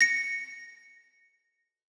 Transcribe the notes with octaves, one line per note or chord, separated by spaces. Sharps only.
A#6 C#7